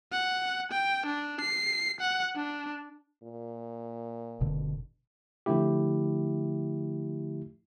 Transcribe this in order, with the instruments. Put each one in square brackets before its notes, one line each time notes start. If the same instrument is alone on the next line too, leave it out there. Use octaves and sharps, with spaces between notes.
[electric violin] F#5
G5
D4
C7
F#5
D4
[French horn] A#2
[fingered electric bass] F#1 B2 D3
[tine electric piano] D3 F3 A3 E4 G4